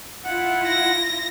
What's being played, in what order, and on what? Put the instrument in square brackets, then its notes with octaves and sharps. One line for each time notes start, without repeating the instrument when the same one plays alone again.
[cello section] E4 F4 [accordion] F#5
[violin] A#6